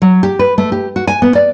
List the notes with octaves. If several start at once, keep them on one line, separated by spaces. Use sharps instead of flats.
F#3
G4
B4
A3
G4
F#4
G#5
B3
D5